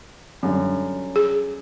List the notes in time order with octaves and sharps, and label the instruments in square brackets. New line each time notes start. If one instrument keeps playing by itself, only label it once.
[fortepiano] F#2 D3 G3
[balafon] G#4